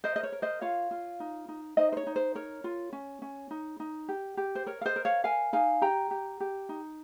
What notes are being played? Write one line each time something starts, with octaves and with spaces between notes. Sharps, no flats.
A#4 C5 D#5
D#5
C#5
A#4
C5 D#5
F4 C#5 F5
F4
D#4
D#4
D#4 C5 D#5
C5
C#5
D#4
C5
A#4 C#5
F4
C#4
C#4
D#4
D#4
G4
G4
C5
A#4 C#5
F5
C5 D#5
A#4
C#5 F5
A#4 F5 G#5
D#4 F5 G#5
G4 G5 A#5
G4
G4
D#4